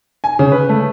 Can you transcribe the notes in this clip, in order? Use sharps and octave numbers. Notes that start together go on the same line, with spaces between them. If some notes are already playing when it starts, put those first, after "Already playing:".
G#5
C#3
B4
A3